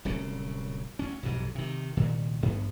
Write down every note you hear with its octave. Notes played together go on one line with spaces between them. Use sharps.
D1 C2 C#3 C#4
D2 C#4
B1 F2 G#2 C3
C3 D#3
C2 A#2 D#3
A1 G2 B3